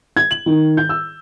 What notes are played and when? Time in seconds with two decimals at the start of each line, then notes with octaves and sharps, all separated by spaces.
0.16 G#6
0.31 F#7
0.46 D#3
0.77 G6
0.89 E6